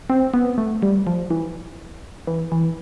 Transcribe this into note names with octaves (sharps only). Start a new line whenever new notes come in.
C4
B3
A3
G3
F3
E3
E3
E3